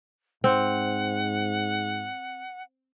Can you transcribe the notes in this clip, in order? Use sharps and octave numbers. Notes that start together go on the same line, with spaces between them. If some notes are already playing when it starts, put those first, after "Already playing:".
G#2 C4 F#5